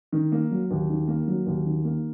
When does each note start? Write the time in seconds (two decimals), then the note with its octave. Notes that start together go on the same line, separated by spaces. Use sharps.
0.12 D#3
0.32 A#3
0.51 F#3
0.71 D#2
0.90 D#3
1.08 A#3
1.28 F#3
1.47 D#2
1.66 D#3
1.85 A#3